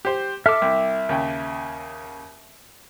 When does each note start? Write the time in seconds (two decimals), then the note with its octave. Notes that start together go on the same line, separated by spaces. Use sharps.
0.05 G4 C5
0.46 A4 E5 D6 F6
0.62 C2
1.09 D#2 C#3 G5